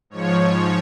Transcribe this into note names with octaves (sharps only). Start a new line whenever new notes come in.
G#2 F3 C#5